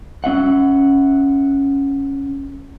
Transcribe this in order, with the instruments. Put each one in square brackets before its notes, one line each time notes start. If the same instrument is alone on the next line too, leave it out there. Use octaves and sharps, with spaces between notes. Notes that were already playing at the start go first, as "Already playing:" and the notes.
[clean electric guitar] C#4 E5 F#5